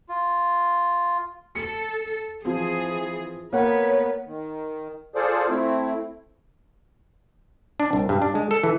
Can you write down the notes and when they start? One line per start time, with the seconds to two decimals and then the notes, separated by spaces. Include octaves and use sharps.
0.09 F4
1.55 A4 C#7
2.45 E3 F3 C4 G#4
3.53 A#3 B3 B4 C#5 F#5
4.26 D#3
5.15 F4 G#4 A4 C5 D5
5.50 A3 C4 E4
7.80 D4
7.93 C2
8.09 G2
8.22 D4
8.35 G#3
8.51 A4
8.63 E3